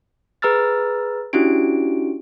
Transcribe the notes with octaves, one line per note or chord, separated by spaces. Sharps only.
G#4 B4 A#5 E6 F6 A6
C#4 D4 E4 F#4 G4 D7